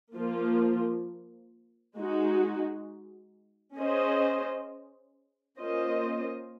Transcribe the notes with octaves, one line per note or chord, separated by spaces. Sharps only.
F3 A#3 F4
G#3 D#4 F#4
C#4 G#4 C5 D#5
A#3 C#4 F4 C5 D#5